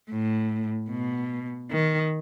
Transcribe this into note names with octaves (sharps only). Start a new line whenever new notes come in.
A2
B2
D#3